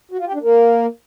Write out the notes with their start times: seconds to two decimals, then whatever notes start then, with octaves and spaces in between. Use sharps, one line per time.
0.11 F#4
0.19 F4
0.26 G4
0.34 D4
0.41 A#3